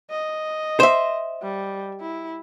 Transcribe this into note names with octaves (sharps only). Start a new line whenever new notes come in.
D#5
C5 E5
G3
E4